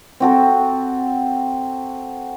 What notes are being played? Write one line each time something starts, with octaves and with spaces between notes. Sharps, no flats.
C4 F#4 A4